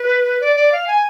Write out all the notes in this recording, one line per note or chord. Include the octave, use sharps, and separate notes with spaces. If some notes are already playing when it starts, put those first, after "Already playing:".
Already playing: B4
D5
D5
F5
G#5